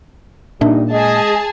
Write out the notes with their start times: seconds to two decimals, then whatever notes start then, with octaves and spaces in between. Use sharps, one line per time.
0.61 A#2 G3 D4 D#4 E5
0.91 G#3 G#4 D#5 A5